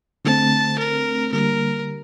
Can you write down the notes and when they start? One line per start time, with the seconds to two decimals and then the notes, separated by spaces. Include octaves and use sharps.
0.25 D3 A3 C4 A5
0.78 A#4
1.33 D3 G3 A#3 A#4